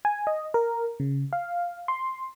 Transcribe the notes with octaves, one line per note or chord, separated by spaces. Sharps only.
G#5
D#5
A#4
C#3
F5
C6